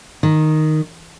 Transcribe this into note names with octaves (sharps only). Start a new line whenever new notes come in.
D#3